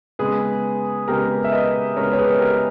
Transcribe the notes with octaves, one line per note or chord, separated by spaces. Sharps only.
C#3 G#3 B3 G#4 B4
C#3 G#3 B3 G4 A#4
E5
B4 D#5
C#3 G#3 B3 A#4 C#5
C#5
G#4 B4
G4 A#4